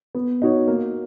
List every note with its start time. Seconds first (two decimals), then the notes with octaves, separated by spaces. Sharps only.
0.15 B3
0.42 D#4 F#4 C#5
0.68 A#3